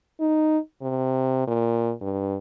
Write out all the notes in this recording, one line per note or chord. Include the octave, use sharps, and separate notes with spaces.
D#4
C3
A#2
G2